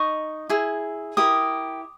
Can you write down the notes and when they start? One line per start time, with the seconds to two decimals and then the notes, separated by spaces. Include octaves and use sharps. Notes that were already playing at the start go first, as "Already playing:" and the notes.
Already playing: D#4 D#5 C#6
0.49 E4 G#4
1.17 E4 G4 A#4 D#6